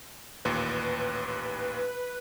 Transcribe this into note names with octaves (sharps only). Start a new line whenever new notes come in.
A1 D#2 A#2 B4